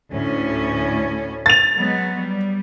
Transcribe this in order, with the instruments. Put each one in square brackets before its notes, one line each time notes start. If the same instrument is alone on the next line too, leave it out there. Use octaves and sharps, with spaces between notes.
[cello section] D2 A2 C#4
[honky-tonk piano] A6 F7
[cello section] F#3 G#3 B3
G3